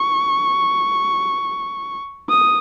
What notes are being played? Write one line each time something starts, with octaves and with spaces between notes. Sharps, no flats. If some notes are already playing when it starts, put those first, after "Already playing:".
Already playing: C#6
D#6